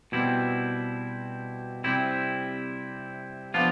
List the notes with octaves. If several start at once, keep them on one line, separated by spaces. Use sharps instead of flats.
B2 G3 C4 E4
C3 G3 C4 E4
F3 B3 D4 F4